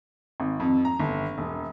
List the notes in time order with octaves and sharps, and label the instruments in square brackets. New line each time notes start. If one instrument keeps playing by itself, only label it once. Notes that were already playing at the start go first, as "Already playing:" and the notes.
[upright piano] G#1
F2
A#5
G1
E1